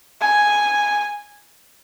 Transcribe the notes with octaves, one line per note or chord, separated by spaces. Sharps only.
G#5